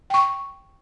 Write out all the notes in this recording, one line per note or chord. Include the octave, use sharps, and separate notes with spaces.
G5 C#6